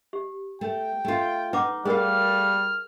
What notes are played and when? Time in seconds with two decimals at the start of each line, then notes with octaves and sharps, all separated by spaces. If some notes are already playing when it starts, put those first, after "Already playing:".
0.13 G4
0.61 A3 G5
1.05 A3 F4
1.53 D#4 B4 F#5 D6
1.85 G3 A3 G#4 A#4 F5 F6